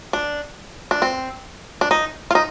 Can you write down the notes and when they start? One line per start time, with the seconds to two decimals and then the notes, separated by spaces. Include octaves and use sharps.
0.13 D4
0.91 D4
1.02 C4
1.81 D4
1.91 D#4
2.31 F4
2.35 D#4